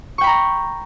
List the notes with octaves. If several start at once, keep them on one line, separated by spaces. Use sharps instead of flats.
G5 A#5 B5 C#6